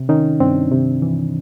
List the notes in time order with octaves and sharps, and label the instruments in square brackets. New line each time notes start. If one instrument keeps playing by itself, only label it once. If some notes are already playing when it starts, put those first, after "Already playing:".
Already playing: [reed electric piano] C3
D#3 C#4 D#4
G2 C4 D4
C3
E3